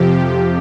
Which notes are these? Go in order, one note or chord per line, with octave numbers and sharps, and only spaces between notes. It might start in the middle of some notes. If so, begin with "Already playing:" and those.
Already playing: F2 C3 F3 G4